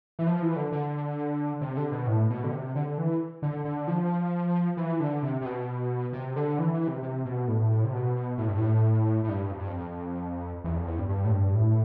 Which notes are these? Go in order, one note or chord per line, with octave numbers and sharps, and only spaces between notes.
E3
F3
E3
D3
D3
C3
D3
B2
A2
B2
D3
C3
D3
E3
D3
D3
F3
E3
D3
C3
C3
B2
C3
D3
E3
E3
C3
C3
B2
A2
C3
B2
A2
G2
A2
A2
G2
F2
G2
F2
E2
F2
E2
G2
G2
A2
G2
A2